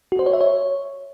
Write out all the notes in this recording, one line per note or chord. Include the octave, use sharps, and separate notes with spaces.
F#4
C5
C#5
E5
C#5